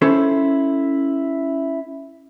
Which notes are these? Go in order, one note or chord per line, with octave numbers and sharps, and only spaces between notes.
C#4 E4 A4 C5 C#5